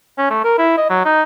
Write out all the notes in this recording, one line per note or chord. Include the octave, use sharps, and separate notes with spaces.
C#4
A3
A#4
E4
D#5
F#3
D#4